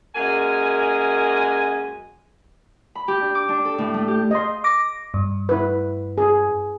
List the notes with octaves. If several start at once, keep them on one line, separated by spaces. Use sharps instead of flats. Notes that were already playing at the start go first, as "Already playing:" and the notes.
F#2 G#3 A#3 G#5
B5
G4
D4
D6
D4
A4
A2
A3
G4
D#5 C6
D6 A#6
G2
E4 B4
G#4